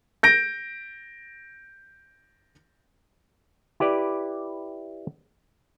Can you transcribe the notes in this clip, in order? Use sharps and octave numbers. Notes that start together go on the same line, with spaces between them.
G6 A#6 D7
E4 G4 B4 D5